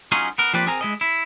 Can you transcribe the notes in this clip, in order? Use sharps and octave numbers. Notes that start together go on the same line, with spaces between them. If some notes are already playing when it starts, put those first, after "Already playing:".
F#3 C#4 D#4 F4 G#4
B3 A#4
F3 A#3 C4 G4 B4 D5
C4 G#4 A#4 G#5 A#5
G#3 E4 D#5
E4